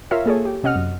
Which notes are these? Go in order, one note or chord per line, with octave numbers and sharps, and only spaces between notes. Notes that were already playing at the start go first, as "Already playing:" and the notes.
F4 A#4 C#5 E5 F5
A#3 G#4 A4 C#5
G4
C3 C#4 D#5 F#5 F6
F#2